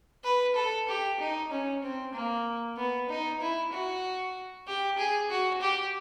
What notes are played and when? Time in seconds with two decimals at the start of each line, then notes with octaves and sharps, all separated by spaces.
0.24 B4
0.56 A4
0.88 G4
1.20 D#4
1.51 C#4
1.83 C4
2.14 A#3
2.77 B3
3.09 D#4
3.40 E4
3.72 F#4
4.67 G4
4.98 G#4
5.30 F#4
5.61 G4